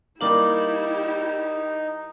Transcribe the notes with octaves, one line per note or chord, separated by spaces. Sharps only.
G3 A#3 D#4 E4 G4 A#4 D6 F#7